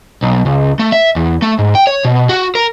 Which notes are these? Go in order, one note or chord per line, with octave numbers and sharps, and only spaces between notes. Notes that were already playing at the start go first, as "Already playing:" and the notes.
B1
C#2
A3
E5
E2
A3
G#2
G5
C#5
B2
F#4
A#4